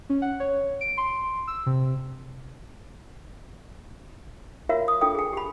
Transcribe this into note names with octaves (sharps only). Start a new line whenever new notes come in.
C#4
F#5
C#5
D7
C6
E6
C3
F4 F#4 A#4 C#5 E5 F5
D#6
D4 F4 A4 G5 D#6
G#4 G#5
G4 B5